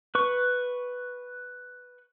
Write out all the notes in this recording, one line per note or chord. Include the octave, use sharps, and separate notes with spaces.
B4 C#6